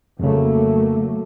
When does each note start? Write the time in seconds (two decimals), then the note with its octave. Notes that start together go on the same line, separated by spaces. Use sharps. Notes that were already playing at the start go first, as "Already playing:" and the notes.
0.19 F2 C#3 F#3 A3 A#3